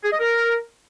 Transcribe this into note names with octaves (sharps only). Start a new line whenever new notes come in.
G#4
D#5
A#4